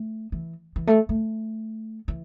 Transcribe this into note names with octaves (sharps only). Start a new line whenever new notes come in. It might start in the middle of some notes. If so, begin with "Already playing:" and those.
Already playing: A3
E3
E3
A3
A3
E3